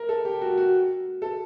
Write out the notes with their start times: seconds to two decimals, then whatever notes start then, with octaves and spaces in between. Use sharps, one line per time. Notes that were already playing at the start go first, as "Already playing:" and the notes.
Already playing: A#4
0.09 A4
0.25 G4
0.41 F#4
0.58 F#4
1.22 A4